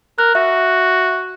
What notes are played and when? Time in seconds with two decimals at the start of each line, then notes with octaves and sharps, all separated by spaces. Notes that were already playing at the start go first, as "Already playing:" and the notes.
0.18 A#4 F#6
0.35 F#4 E5